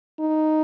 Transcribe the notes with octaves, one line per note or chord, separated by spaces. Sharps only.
D#4